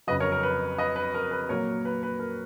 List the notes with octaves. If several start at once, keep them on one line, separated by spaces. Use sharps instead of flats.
F2 C#3 F#3 B4 D#5
A#4 C#5
A#4
B4
B4 D#5
B4
A#4
B4
A#2 F#3 A#3 A#4 C#5
B4
B4
A#4